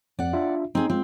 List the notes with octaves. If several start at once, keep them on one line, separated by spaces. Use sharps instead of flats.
F2 D5 F#5
D4 F4 E5
C4 D#4 G#4
G#3 C4 F4